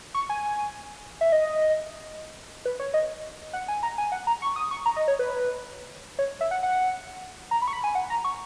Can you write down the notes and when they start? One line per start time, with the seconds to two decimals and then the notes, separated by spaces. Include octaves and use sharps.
0.15 C#6
0.30 G#5
1.21 E5
1.32 D#5
2.65 B4
2.80 C#5
2.94 D#5
3.53 F#5
3.68 G#5
3.83 A#5
3.98 G#5
4.12 F#5
4.27 A#5
4.42 C#6
4.56 D#6
4.71 C#6
4.86 A#5
4.96 D#5
5.08 C#5
5.19 B4
6.19 C#5
6.41 E5
6.51 F#5
6.63 F#5
7.51 A#5
7.62 B5
7.68 C#6
7.73 B5
7.84 G#5
7.95 F#5
8.10 A#5
8.25 C#6